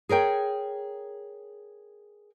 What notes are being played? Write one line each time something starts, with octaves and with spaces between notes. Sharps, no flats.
G#4 A#4 C#5 G5